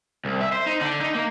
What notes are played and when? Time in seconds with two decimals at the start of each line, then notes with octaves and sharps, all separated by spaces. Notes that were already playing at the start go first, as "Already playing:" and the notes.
0.25 C2
0.41 E5
0.53 C5
0.67 D#4
0.81 D3
1.00 D#4
1.15 A#3